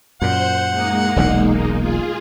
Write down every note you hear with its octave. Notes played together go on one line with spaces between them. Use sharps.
F#2 A#2 C5 F#5 G6
G#3 A#3 D#4
E1 B1 A#2
F4 G#4